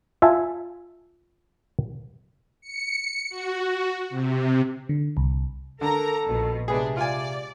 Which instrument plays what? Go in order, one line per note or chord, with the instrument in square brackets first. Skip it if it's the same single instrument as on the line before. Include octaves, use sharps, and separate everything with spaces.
[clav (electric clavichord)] F4 E5 G#5 A5
[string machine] C#7
F#4
C3
[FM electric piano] D3
C2
[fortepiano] D3 [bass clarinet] A4 [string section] A#4 A#5
[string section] A#1 B2
[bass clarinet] C3 [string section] G#3 D4 [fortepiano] B3 G#4
[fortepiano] F4 G#5 [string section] D5